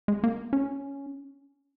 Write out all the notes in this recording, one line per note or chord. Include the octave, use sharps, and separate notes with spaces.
G#3
A#3
C#4